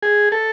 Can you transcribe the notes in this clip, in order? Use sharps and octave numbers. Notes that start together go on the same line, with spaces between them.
G#4
A4